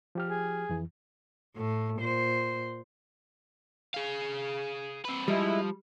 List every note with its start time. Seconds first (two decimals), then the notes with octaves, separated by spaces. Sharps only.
0.15 F3 G4 F6
0.28 G#4
0.69 F2 E3
1.55 A2 A3
1.98 A#2 C5
3.94 G#4 F5
5.05 C4 B4
5.28 F3 G3 G#3 E4